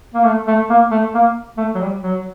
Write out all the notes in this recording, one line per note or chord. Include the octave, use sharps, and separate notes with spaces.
A#3
A3
A3
A#3
A3
A#3
A3
F#3
G3
F#3